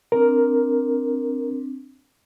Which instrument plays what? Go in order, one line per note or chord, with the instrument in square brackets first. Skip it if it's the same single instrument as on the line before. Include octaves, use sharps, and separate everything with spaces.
[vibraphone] C4 D4 [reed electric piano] A#4